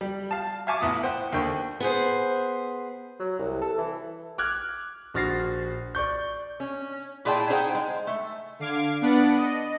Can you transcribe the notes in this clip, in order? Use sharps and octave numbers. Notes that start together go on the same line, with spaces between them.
G3
F5 A5
E5 F5 G#5 A5 C#6 D6
A1 B3 E4 D#6
C5 F#5 G5
D#2 D3 A#3 G5 C#6
B3 G#4 C5
F#3
C2
A4
E3
D6 F6 F#6 G#6
A#1 F#4 F6 A6 A#6 C7
D5 C#6 G6
C#4
A#2 E4 G#4 D5 G5 A5
D#4 G#4 C5 F#5 G5
G#3
A3
D3 F5 D6 G#6
B3 D4 B4 D5 F#5
D#5